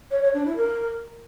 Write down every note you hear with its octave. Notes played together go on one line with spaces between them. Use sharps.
C#5
C#5
D4
E4
A#4